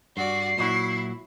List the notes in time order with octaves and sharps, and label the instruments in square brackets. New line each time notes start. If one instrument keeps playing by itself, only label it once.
[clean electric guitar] G2 [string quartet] F#4 D5 [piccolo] C7
[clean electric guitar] A#2 F#3 F#4 [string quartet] E4